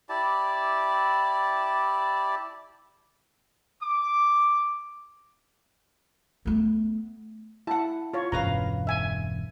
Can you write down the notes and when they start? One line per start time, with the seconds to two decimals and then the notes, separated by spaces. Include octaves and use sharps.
0.09 E4 G4 D5 A5
3.81 D6
6.46 A3 B3
7.67 E4 F#5 A5
8.13 F4 C#5
8.32 E1 G2 C#4 B4 F5 A#5
8.87 E5 G#5